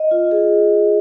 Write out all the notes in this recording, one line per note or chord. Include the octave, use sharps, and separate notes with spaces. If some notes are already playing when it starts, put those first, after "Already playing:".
Already playing: D#5
F4
G#4